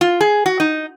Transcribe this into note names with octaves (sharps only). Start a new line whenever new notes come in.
F4
G#4
F#4
D#4